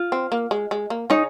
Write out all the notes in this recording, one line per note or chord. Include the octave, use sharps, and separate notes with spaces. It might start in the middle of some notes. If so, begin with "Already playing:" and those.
Already playing: F4
C4
A#3
G#3
G#3
A#3
C#3 C#4 D#4